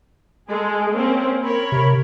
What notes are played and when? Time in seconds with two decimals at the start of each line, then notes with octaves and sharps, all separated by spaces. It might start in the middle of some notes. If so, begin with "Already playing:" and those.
0.49 G#3 G#4 A4
0.92 A#3 C4 C#4
1.43 A#4 C#5 B5
1.72 C3